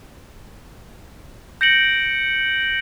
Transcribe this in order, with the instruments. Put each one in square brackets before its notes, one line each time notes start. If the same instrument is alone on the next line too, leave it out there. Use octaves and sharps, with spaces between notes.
[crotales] G6 A#6 C#7 D7 F#7